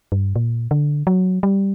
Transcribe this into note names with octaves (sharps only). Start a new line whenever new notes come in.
G2
A#2
D3
F#3
G3